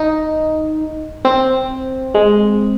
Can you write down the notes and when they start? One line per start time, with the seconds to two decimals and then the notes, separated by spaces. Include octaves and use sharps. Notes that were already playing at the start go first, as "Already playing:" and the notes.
Already playing: D#4
1.25 C4
2.15 G#3